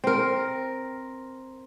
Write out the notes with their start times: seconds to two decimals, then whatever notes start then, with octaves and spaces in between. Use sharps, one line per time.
0.04 C4 A#4